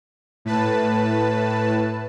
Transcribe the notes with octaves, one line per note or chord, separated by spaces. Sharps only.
A2 B4 A5